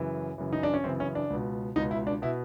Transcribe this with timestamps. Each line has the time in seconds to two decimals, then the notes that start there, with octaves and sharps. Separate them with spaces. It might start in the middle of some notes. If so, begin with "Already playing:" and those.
Already playing: F#2 C#3 E3
0.38 F#2 C#3 E3
0.53 D#4
0.63 D4
0.74 C#4
0.84 F#2 C#3 E3 C4
1.00 C#4
1.15 D4
1.30 C#2 B2
1.76 C#2 B2 D#4
1.91 E4
2.07 D4
2.22 B2 E4